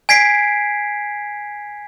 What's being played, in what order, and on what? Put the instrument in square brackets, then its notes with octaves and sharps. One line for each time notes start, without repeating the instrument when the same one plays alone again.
[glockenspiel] G#5 G#6 B6 C7 D7